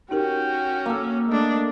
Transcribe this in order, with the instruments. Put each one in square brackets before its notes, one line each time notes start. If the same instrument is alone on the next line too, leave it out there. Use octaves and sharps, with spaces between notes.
[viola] C#4 F#4 [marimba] D#4 G4 A#4 [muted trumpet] G5
[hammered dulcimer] A#3 A4
[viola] A3 D4 [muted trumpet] D#5